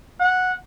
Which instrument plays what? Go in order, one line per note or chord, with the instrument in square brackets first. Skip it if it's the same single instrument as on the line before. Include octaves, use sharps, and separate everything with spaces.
[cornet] F#5